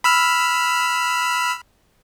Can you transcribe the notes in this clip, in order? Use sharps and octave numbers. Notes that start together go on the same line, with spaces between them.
B5 E6 F6